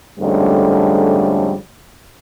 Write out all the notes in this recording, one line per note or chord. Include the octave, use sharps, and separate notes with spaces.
F2 G#2 D3 G3 A3 C#4